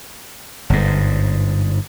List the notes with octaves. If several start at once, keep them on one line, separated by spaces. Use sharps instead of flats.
G1 G#2